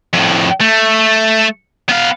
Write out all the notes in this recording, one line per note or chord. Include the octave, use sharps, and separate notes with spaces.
F2 A2
A3
B3 F5